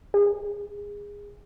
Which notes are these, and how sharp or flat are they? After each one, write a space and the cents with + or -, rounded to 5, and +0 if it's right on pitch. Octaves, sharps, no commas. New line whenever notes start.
G#4 -20